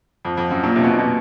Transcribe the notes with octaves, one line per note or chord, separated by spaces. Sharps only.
F2
F2
F#2
A#2
C3
B2
A#2
B2